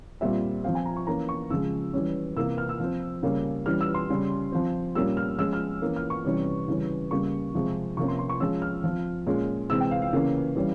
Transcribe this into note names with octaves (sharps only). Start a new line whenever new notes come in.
A#2 G3 C4 E5
F3 C4 F5
G#5
A#5
C#6
E3 A#3 C#4 A#5
C#6
C#3 F3 G#3 E6
E3 G3 C#4
C3 E3 A#3 E6
F6
E6
F3 C4
C#3 G3 A#3 C#4
E3 G3 C#4 F6
E6
C6
C#3 G3 C#4
F3 C4
A#2 G3 A#3 C#4 E6
F6
F3 G#3 C#4 E6
F6
E3 A#3 C#4
F6
C#6
C3 E3 G3 C#4
C#3 E3 G3 C#4
C#3 G3 A#3 C#6
C3 F3 G#3 C4
C3 F3 A#3 C#4 C#6
C6
C6
C#6
F3 G#3 C#4 E6
F6
F3 C4
A#2 G#3 C#4
C3 E3 G#3 C4 E6
G5
F5
F5
C#3 E3 A#3 C#4
E3 G3 C#4